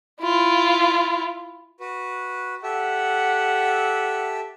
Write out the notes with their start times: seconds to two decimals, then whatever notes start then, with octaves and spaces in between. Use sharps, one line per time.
0.22 E4 F4
1.80 F#4 B4
2.63 G4 A4 E5 F#5